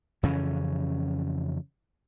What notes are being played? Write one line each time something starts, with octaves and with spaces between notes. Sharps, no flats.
F2 C#3 E3 C#4